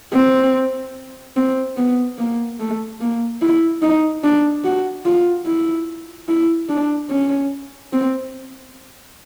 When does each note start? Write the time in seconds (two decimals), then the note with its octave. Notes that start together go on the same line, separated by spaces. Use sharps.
0.14 C4
1.36 C4
1.77 B3
2.18 A#3
2.60 A3
3.01 A#3
3.42 E4
3.82 D#4
4.24 D4
4.64 F#4
5.06 F4
5.46 E4
6.29 E4
6.69 D4
7.10 C#4
7.93 C4